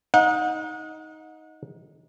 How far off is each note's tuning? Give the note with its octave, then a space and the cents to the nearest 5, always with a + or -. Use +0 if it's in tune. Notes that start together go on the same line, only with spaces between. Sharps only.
D#4 +10 F#5 -35